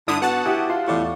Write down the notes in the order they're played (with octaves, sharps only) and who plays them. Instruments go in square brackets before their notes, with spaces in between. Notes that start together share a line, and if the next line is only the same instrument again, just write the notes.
[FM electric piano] G2 [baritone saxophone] D3 [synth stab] D4 E4 D#6
[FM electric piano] B3 [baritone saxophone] F#4 [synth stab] F#5 A5
[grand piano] E4 G4 [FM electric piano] G#5 D6 D#6
[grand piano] F4 [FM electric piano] C6
[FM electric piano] E2 D5 C#6 [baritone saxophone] A2